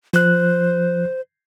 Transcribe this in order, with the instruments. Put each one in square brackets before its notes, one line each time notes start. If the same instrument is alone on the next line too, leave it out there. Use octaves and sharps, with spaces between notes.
[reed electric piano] F3 F#6 [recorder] C5